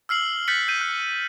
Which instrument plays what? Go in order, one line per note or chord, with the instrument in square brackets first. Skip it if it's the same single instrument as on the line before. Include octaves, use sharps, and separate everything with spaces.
[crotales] E6 F6 C7 F#7
F#6 G6 A6 B6 C#7 F#7
G6 C7 D#7
F#6